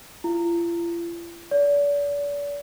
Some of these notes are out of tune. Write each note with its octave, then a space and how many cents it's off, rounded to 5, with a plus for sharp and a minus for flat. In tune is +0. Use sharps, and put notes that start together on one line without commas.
F4 -45
D5 -40